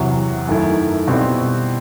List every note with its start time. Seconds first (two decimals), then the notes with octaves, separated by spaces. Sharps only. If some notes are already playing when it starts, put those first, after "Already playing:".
Already playing: E2 C3 F#3
0.47 F#2 D#3 A3 E4
1.07 B2 G3 C4 E4